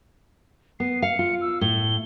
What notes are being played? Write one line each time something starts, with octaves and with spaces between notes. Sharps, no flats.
B3 C7
F5 C#7
F4
E6
A2 G7